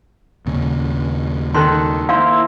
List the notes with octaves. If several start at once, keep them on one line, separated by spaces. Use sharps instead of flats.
D#2 A#2 C#3
D#3 A4 C6 F#6
A#3 E4 C5 F5